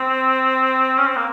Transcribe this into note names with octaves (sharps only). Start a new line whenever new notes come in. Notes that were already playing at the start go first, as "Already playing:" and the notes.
Already playing: C4
C#4
C4
A#3